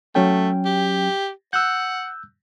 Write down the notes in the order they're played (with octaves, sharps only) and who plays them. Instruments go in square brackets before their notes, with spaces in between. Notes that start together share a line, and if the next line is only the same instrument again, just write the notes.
[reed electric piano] F#3 C#4 G5 [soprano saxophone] A3
[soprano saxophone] G4
[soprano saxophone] F#5 [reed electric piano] E6 F#6 G6